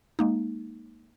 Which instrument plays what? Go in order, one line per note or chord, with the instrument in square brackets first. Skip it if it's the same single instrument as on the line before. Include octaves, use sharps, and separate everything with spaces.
[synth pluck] G#3 A#3 D#4